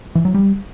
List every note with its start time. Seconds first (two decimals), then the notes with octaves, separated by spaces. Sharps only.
0.15 E3
0.25 F#3
0.34 G3